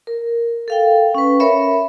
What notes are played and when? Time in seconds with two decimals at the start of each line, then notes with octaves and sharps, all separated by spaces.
0.07 A#4
0.68 A4 F5 G5
1.15 C#4 B4
1.40 A#4 C#5 E5 B5